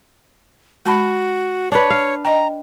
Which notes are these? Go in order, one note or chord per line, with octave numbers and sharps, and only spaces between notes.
G#3 F#4 A5 B5
D4 B4 C#5
F5
D#5 G5 A#5